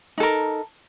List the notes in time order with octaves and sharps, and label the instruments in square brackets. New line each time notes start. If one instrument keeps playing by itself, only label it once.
[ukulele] D#4
A4
A#4